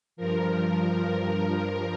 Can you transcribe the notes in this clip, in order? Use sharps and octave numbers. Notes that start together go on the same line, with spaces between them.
G2 F3 A#4